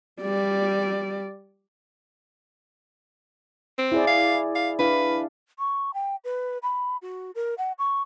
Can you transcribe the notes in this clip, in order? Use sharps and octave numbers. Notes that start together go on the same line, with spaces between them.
G3 D5
C4
E4 G#4 D5
F5
F5
D4 E4 B4 F5
C#6
G5
B4
B5
F#4
A#4
F#5
C#6